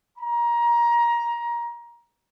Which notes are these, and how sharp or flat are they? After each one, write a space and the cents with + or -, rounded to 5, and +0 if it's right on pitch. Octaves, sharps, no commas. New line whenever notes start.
A#5 +20